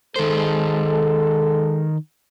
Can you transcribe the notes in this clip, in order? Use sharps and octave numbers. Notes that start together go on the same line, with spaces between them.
D#3 G#3 A4 C5